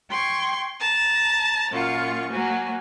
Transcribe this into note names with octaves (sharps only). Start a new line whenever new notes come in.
G5 C6 C#6 G#6
A5 A#5
F#2 A#2 F4 F5 C#6
F#3 A#3 F#4 G#5